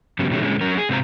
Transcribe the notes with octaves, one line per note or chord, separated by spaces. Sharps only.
G2 C#3 F#3 G3 B3 C#4
B2 D#3 F#3 G3 A3 C#4
A#2 D3 G#3 C#4
F#3 C#4 A#4
G#4
G#2 C3 C4 C5 F5 A#5